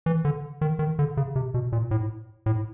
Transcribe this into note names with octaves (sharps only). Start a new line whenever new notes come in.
E3
D3
D#3
D#3
D3
C#3
C3
B2
A#2
A2
A2